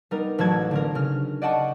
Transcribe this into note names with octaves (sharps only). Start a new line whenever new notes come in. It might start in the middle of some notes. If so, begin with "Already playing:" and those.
G3 B3 D#4 A#4
A1 F#3 A3 F#4 A5 G#6
D3 C4 A#4
C#3 F6
D5 D#5 F#5 G5 A5 C#6